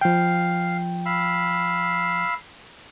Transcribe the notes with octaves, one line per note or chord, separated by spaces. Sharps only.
F3 F5 G5
F5 B5 E6